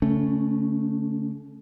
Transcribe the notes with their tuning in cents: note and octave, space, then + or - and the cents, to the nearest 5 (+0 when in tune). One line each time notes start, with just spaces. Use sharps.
D3 -40 A3 +0 C#4 +0